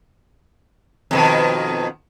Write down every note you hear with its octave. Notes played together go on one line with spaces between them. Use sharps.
F2 B2 D#3